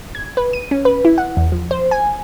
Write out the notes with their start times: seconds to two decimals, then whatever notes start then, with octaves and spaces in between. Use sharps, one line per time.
0.15 G#6
0.37 B4
0.53 D#7
0.71 C#4
0.85 B4
1.05 E4
1.18 F#5
1.37 E2
1.52 F3
1.71 C5
1.91 G#5